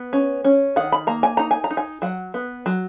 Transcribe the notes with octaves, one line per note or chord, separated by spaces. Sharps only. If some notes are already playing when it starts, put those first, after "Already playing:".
Already playing: B3
C#4
C#4
D#3 F#5
B5
A#3 A#5
G#5
D#4 A#5
G#5
A#5
D#4
G#5
F#3 F#5
B3
F#3